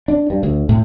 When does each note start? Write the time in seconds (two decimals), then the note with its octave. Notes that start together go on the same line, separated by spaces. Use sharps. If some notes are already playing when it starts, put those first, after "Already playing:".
0.08 D4
0.30 G2
0.43 D2
0.69 A2